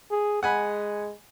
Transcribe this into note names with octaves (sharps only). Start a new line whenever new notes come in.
G#4
G#3 F#5 G#5 B5